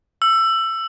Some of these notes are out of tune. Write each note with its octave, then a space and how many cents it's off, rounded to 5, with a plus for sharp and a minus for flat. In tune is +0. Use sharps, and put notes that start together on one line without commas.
E6 +20